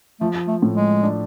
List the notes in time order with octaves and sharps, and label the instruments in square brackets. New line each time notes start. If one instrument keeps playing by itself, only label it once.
[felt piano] F3 [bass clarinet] A3
[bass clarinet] A3
[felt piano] A2
[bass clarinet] G#3
[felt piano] D4